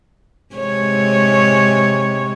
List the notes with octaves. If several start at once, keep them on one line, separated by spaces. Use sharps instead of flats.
C3 G#3 C#5